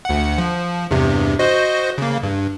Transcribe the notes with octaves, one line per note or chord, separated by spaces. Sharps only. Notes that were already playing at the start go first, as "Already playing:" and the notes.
D2 F#5
F3
E2 G2 C3
F#4 C5 D#5
C#3 A#3
G2